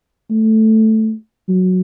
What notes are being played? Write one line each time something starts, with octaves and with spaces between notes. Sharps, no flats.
A3
F#3